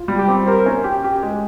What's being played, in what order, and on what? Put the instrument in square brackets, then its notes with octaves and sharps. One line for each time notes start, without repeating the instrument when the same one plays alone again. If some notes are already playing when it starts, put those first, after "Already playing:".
Already playing: [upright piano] F4
G3
[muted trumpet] G4
[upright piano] C4
[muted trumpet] A#4 [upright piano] C5
[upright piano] C#4
G4
G4
G#3